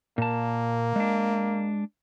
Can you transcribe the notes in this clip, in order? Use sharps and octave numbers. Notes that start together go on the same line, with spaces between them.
A#2 A#3 A5
G#3 D4